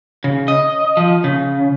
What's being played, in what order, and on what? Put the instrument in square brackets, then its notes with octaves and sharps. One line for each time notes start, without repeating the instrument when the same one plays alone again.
[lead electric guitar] C#3
D#5
F3
C#3